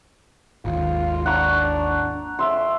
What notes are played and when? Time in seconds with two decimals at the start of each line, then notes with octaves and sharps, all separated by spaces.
0.65 G#1 D#2 F4
1.26 D4 F#5 A#5 C#6
2.39 F2 E5 C6